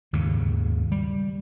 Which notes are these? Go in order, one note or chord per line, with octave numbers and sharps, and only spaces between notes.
D#2 G#2 C#3
G3